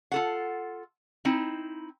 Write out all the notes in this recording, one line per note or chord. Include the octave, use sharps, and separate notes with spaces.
F4 A4 F#5
C4 D#4 E4